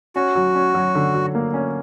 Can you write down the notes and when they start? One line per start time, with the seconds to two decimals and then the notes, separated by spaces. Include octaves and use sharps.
0.16 C#4 F#4
0.35 F#3
0.55 C#4
0.74 F#3
0.95 D3
1.14 F#3
1.35 A#3
1.54 C#4